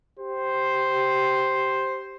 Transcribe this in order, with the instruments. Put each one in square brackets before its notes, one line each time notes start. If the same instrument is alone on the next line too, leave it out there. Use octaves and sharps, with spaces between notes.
[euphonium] G4 [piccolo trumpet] C5